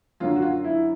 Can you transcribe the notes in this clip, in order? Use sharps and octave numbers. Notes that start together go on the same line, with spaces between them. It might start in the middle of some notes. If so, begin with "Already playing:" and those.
F#2 D3 F#3 F4
F#4
F4
E4